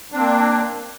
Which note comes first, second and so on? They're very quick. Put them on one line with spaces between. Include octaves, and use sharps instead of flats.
D4 C4 A#3